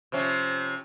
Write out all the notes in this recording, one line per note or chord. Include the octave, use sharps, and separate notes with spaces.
C3 F3 C#4